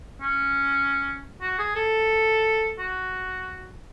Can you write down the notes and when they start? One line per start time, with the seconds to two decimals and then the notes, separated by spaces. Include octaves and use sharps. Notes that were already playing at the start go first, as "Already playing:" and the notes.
0.21 C#4
1.41 F#4
1.59 G#4
1.76 A4
2.79 F#4